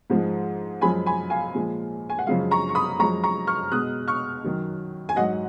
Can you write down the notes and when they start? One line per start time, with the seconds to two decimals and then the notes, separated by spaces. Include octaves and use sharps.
0.10 G#2 F3 G#3
0.81 F#2 F3 G#3 G#5 B5
1.06 G#5 B5
1.30 F5 G#5
1.54 A#2 F3 G#3
2.10 G#5
2.19 F#5
2.26 F#2 C#3 F3 G#3 F5
2.51 A#5 C#6
2.69 C#6
2.75 B5 D#6
2.99 F#2 F3 G#3 A#5 C#6
3.23 A#5 C#6
3.47 C#6 F6
3.71 B2 G#3 D#6 F#6
4.08 C#6 F6
4.44 F#2 D#3 F#3
5.09 G#5
5.16 G#2 F#3 D#5 F#5